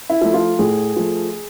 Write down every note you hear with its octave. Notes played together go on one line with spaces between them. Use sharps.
E4
F3 A3
F4
A2 G#4
F3 A3